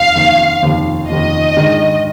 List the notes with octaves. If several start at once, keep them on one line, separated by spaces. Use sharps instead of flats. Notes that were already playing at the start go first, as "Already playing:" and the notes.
Already playing: F1 D#2 D#3 F5
F1 D#2 D#3
F1 D#2 D#3
F1 D#2 D#3 D#5
G#2 D#3 G#3 D4